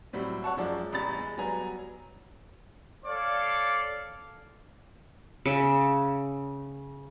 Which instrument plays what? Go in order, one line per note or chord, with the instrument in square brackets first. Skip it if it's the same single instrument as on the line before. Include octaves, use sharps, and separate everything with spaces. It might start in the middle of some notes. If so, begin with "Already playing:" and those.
[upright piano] A2 F#3 G3 C4
C#5 F#5 A5 C#6
F#2 F3 G#3 D5
A1 E2 G3 A#5 B5 A6
G#3
F#3 G3 B3 G#5 A#5
[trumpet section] A4 C#5 D5 F5
[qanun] C#3 E5